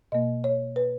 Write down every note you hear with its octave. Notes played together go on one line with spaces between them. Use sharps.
B2 A#3 D#5
C#5
B4